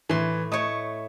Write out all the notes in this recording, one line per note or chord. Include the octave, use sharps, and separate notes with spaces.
A2 E3 C6
A3 C#5 D#5 D#6